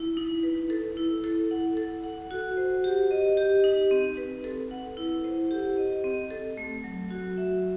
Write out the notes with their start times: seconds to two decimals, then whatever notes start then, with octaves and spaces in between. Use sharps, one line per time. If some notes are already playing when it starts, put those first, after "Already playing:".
Already playing: E4
0.17 D#4
0.43 B4
0.70 A4
0.97 E4
1.24 A4
1.51 F#5
1.77 A4
2.04 F#5
2.31 F#4
2.57 C5
2.84 G4
3.11 D#5
3.37 G4
3.64 D#4
3.91 C4
4.17 B4
4.44 A4
4.71 F#5
4.97 E4
5.24 C5
5.51 G4
5.78 D#5
6.04 C4
6.31 A4
6.57 A3
6.84 F#3
7.11 F#4
7.38 E5